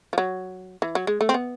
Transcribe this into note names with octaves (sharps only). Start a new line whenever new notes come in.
F3
F#3
E3
F#3
G#3
A3
C4
B3